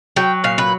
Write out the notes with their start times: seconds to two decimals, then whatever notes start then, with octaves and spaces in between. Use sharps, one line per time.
0.16 F#3 G5
0.44 A#2 F5
0.58 B4